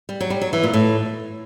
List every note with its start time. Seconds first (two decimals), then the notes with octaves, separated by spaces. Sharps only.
0.09 G3
0.21 F#3
0.30 G3
0.42 F#3
0.53 E3
0.63 A#2
0.73 A2